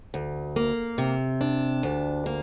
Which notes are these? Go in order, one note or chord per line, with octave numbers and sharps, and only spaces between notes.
D2
A#3
C3
D4
D2
A#3